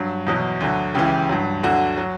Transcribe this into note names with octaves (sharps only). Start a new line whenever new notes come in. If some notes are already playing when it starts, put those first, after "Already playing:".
Already playing: G2 F#3
E2 B2 F#3
D2 D3 F#3
C#2 C#3 E3 G4
G2 F#3
D2 D3 F#3 F#4
F#3